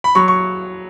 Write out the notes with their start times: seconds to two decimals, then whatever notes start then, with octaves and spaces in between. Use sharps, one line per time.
0.04 B5
0.15 F#3 C#6
0.28 C#6